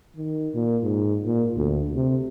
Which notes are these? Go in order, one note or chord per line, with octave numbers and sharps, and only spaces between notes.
D#3
A#2
G#2
A#2
D2
C3